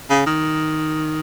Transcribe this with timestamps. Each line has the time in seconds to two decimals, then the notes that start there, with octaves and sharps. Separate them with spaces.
0.10 C#3
0.26 D#3